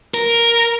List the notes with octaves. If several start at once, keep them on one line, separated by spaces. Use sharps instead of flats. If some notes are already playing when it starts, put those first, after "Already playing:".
A#4